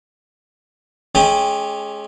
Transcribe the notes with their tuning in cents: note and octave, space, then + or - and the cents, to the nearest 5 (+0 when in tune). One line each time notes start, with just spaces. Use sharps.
G#3 +20 C#4 -5 G4 +20